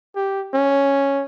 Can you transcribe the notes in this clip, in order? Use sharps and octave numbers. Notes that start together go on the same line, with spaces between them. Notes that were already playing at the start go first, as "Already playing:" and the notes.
G4
C#4